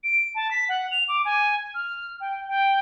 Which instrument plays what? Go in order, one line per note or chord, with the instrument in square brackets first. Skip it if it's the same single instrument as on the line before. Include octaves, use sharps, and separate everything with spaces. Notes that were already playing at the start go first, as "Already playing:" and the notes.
[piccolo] D7
A5
B6
F#5
F7
D6
G#5
F6
G5
G5